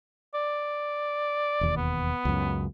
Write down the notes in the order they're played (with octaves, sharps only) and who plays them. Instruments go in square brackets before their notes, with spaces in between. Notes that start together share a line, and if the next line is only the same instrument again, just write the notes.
[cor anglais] D5
[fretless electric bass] E1 D#2
[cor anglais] B3
[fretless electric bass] C#2 F#2